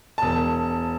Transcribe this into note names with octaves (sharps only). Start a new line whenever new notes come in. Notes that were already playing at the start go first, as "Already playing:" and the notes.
E1 A5